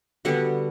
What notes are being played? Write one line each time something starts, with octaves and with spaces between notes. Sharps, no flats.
D3 G3 B3 F#4 F#5